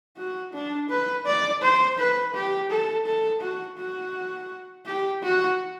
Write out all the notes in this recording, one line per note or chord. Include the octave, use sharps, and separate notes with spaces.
F#4
D4
B4
D5
C5
B4
G4
A4
A4
F#4
F#4
G4
F#4